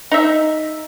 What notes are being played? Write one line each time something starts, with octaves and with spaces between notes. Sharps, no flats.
D#4 E5